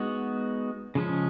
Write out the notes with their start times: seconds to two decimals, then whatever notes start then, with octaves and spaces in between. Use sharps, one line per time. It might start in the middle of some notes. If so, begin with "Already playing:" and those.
Already playing: G#3 B3 D#4 F#4
0.95 C#3 F3 G#3 C#4